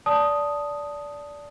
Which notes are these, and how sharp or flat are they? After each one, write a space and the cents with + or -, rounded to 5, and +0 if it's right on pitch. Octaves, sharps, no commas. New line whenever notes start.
D5 -15 A5 +0 D#6 +0